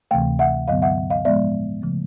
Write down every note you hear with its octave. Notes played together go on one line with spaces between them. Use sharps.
D2 C3 E3 A3 F5 G5
E5 F#5
G2 D3 F#3 B3 D#5 F5
E5 F#5
D#5 F5
A2 F3 G#3 B3 D5 E5
C#3 F3 A3